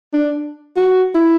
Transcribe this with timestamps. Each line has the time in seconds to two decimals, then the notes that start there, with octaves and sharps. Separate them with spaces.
0.13 D4
0.77 F#4
1.14 E4